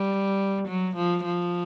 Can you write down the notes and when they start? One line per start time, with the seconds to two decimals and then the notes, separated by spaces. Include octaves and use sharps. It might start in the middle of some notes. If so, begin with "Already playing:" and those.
Already playing: G3
0.68 F#3
0.96 F3
1.25 F3